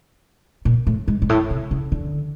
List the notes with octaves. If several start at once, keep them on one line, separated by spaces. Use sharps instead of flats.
A#2
A2
G#2
G#2
A2
C3
C#3
D3